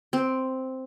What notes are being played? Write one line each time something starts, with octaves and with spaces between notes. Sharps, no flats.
C4